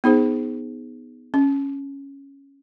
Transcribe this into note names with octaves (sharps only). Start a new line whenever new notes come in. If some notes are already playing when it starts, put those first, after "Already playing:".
B3 D#4 G#4 C5
C#4